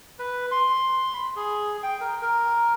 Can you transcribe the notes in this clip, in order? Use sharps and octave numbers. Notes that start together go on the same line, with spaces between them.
B4
C6
B5
G#4
G5
A#4
A#4